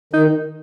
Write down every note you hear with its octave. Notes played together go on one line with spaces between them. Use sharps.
D#3 D#4